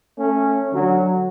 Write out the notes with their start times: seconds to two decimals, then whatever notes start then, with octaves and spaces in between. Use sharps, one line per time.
0.19 A3 C#4
0.72 D3 F#3